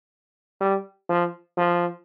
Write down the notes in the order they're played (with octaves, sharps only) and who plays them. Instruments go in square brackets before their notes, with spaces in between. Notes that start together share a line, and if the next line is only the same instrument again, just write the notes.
[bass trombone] G3
F3
F3